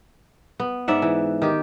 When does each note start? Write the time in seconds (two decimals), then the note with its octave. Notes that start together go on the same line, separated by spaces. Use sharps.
0.60 B3
0.88 G#2 D5 E5 F#5
1.02 E3
1.42 D#3 G4